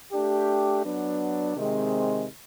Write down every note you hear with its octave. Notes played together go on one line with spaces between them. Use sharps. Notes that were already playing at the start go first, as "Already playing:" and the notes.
A3 D4 G4
F#3 B3 D4
C3 D#3 G#3 C4